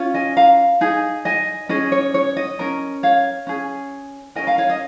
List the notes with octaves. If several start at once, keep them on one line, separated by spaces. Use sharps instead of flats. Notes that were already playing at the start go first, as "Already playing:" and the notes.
Already playing: C#4 F4
D#5 G#5
F5 A#5
D#4 G#4
D#5 G#5
C#4 G#4 D#5
C#5
C#5
D#5
C#4 A#4
C#5 F5
C#4 G#4
C#4 A#4 D#5 G#5
F5 A#5
C#5 F5
D#5